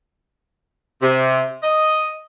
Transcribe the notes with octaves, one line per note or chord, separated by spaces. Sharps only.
C3
D#5